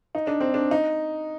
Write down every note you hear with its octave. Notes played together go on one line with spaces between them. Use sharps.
D#4
D4
C4
D4
D#4